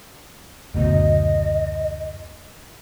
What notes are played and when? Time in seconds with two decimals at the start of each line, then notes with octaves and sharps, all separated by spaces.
0.74 F#1 D2 B2 D#5